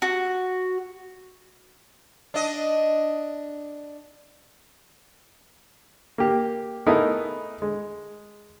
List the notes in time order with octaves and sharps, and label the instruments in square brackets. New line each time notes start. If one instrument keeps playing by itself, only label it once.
[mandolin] F#4
[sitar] D4 D#5
[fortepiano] A#3 G4
A3 B3 D#4 E4 G#4 A#4
G#3